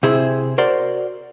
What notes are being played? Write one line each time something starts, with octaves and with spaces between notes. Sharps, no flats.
C3 E4 G#4 C5
F#4 A#4 C5 D5